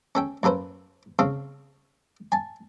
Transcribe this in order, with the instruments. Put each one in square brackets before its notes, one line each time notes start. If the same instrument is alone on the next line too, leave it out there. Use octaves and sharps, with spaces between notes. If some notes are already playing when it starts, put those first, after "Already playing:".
[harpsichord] C#4 A4 G5
F#2 A#3 A4 B4 C5
C#3 C4 A4 F5
G#5 A5